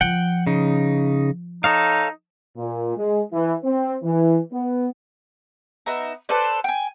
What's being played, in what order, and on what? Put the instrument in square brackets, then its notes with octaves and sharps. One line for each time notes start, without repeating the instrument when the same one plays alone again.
[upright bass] F3 [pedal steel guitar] F#5 G5
[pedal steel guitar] C#3 D#4
[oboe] D#4 [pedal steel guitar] A4 C#5 F5
[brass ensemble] A#2
G#3
E3
C4
E3
B3
[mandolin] B3 D#4 E5 A#5
A4 B4 C5 D5
G5 G#5